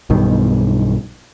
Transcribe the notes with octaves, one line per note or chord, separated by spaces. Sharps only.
B1 G2 B2 D#3